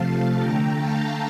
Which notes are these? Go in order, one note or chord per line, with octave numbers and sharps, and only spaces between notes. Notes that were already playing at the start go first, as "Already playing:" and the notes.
Already playing: C3 F3 A3 F5 A5
D3 A3 G5 A#5
F5 A5